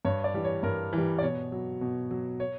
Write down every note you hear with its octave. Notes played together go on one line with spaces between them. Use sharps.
G2 C#5
D5
E3 G3
C#5
G2 A#4
E3 G3
D5
B2 C#5
F#3
B2
F#3
C#5